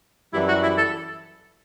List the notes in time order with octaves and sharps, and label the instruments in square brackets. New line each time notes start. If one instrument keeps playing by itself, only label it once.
[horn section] F#2 E3 G3 [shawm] E4
[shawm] F#4
E4
A4